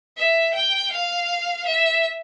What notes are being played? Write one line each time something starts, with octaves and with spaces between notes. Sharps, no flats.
E5
G5
F5
E5